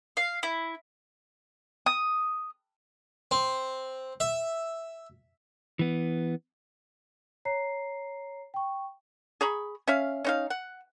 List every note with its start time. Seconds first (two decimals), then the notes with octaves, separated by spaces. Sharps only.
0.17 F5
0.43 E4
1.86 D#6
3.31 C4
4.20 E5
5.79 E3 B3
7.45 C#5 A#5 C7
8.54 G5 C#6
9.41 G#4 A#5 B5 C#6
9.88 C#4 E5 F5
10.25 C#4 D#4 F5
10.50 F#5